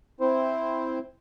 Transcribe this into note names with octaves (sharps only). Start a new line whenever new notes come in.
C4 E4 C5